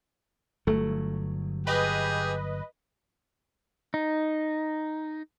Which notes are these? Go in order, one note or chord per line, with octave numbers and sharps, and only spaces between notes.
G1 F#3 A3
G4 G#4 B4 D#5
D#4